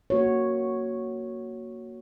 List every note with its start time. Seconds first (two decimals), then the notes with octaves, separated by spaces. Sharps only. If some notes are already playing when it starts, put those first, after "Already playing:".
0.10 A#3 F#4 C#5